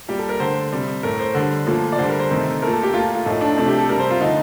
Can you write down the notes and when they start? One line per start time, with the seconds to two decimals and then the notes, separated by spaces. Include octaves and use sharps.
0.09 A#2 G3 G4
0.19 A4
0.29 A#4
0.40 D3 A3 C5
0.72 C3 G3
1.03 A2 A3 A#4
1.19 C5
1.35 D3 G3
1.67 A#2 F3 A3
1.92 D5
1.98 D3 G3 C5
2.09 A#4
2.19 C5
2.31 C3 D#3 A3
2.62 A#2 A3 A#4
2.73 A4
2.83 G4
2.94 A#2 F4
2.97 A3
3.15 F4
3.25 A2 F3 A3 D#4
3.41 D4
3.57 C3 F3 A3 D4
3.68 G4
3.78 A4
3.89 C3 G3 A#4
3.99 C5
4.11 F4
4.21 D3 F3 A3 D#4